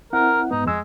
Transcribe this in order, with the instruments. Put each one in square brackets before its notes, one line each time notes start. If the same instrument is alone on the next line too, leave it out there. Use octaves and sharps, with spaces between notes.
[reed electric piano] C4 E4 F#5 [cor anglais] A#4
[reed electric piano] G#2 B3 [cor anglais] D#4
[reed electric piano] F2 E6 [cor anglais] G#3